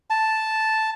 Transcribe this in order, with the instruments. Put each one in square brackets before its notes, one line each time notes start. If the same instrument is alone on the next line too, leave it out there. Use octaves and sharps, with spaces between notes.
[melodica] A5